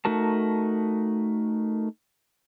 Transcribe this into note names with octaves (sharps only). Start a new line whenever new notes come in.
A3 D#4 F#4 A#4 A5